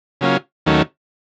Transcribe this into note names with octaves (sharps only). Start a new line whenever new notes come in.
C#3 F#3 A#3 C#4 F4
D#2 D#3 F#3 A3 C#4